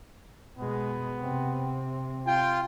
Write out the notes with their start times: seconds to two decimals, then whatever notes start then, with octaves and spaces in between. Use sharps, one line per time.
0.57 B2 G#3 B3
1.19 C3 C4
2.27 F4 G5